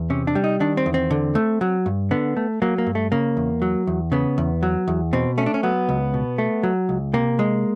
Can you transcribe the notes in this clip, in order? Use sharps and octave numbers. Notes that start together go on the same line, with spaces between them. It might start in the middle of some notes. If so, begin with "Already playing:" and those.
Already playing: E2
C3 C#4
D4
G3
D#4
D#3 D4
C4
E2
C4
D3
A3
F#3
G2
D3 B3
A3
F#3 A#3
A#3
G2
A3
C#3 A#3
E2
F#3
E2
C#3 B3
E2
F#3
E2
B2 C4
A3 C#4
D4
C#4
F#3 B3
C#2
B2
A3
F#3
C#2
C3 A#3
G#3